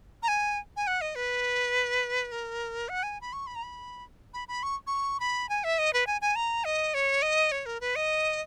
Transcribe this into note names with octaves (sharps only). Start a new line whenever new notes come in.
A#5
G#5
G#5
F#5
D#5
B4
A#4
F#5
G#5
B5
C#6
B5
A#5
B5
B5
B5
C#6
C#6
B5
G#5
E5
D#5
B4
G#5
G#5
A#5
D#5
C#5
D#5
C#5
A#4
B4
D#5